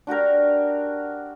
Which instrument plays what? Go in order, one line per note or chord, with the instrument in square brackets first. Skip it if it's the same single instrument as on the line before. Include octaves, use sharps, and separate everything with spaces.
[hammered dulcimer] D4 F#4 G4 A#4